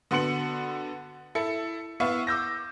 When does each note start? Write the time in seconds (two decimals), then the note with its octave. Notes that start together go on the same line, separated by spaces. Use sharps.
0.11 D3 B3 F#4 C6 C#7 F#7
1.35 E4 A4 C#7
2.00 B3 E4 E5 F5 C#6
2.27 D6 E6 G6 A#6